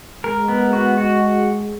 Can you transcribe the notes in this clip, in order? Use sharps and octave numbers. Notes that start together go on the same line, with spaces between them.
G#3 A#4
B3
F#4
F#4